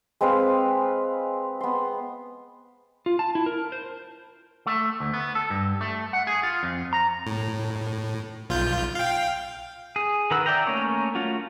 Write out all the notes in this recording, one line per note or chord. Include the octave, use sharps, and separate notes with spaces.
G#3 C4 B4 F5
B3 C6
F4
A5
E4
A#4
C5
A3
D2
B3
A4
G2
A3
F#5
G#4
F4
F2
A#5
A2
B1 F4 G6
F5 G5
G#4
D#3 A#4 B4 F#5 E6
D5 E5 G5 A#5
A3 A#3 C#4 A#4 C#5
A3 C#4 F4 F#4